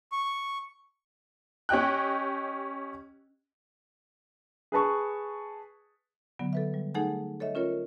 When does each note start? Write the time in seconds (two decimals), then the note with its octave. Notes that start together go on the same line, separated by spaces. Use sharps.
0.12 C#6
1.69 C#4 G4 D#5 G5 F#6
4.72 G#4 B4 A5 C#6
6.39 D3 F#3 B3
6.53 A4 B4 E5
6.74 G3
6.95 A3 D#4 G#4 A4 F#5 G#5
7.40 A4 C#5 D#5 E5
7.55 C#4 F4 A#4 C#5